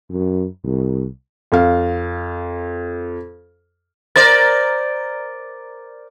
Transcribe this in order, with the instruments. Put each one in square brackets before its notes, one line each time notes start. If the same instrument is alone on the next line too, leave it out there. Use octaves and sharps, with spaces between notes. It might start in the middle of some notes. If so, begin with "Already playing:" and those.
[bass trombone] F#2
C2
[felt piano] F2 F5
[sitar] A#4 C5 D5 [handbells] A6